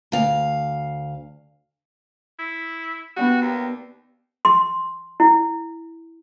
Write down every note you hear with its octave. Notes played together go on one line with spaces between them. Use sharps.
D2 F5
E4
B3 D4 F#4 G4
D#2
C6
E4